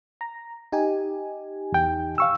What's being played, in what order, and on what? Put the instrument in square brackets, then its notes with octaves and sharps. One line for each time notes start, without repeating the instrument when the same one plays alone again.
[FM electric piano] A#5
D#4 G4 G#5
[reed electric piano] E2 G5
F5 C#6 E6